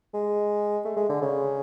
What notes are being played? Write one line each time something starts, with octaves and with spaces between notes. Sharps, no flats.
G#3
A3
G#3
D3
C#3